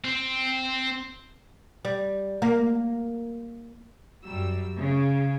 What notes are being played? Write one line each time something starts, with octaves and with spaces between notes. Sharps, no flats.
C4
G3
A#3
F#2 F#3 G3 E6
C#3